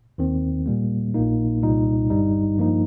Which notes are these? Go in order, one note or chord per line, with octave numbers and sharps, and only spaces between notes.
D#2 D#3 C4
A#2 G3 A#3
A#1 A#2 A#3 D#4
C2 A#2 G3 D#4
G1 G2 G3 D#4
G2 F3 A#3 D#4